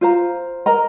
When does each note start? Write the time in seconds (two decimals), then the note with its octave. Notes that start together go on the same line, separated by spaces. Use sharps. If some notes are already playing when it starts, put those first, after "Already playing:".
0.01 F4 C5 F5 A#5
0.66 A#4 D#5 A#5